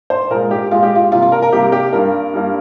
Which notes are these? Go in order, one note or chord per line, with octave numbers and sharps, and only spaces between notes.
C5
A#2 G#3 A#4
G4
A#2 G#3 F4
G4
F4
C3 G3 A#3 F4
F4
A#4
A#4
C3 G3 A#3 G4
G4
G2 G3 A#3 A#4
G2 G3 A#3